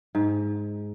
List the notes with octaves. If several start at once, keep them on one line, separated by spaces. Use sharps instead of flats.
G#2